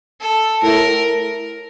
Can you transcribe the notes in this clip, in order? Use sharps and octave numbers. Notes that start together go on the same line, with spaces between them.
A4
A2 A#4